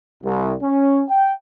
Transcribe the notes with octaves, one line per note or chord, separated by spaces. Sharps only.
C2
C#4
G5